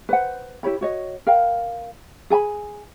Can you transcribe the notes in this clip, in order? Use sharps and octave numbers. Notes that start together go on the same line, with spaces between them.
B4 C5 F#5
E4 G4 C#5 B5
F#4 C#5 D#5
A#4 F5 G5
G#4 G#5 A5 B5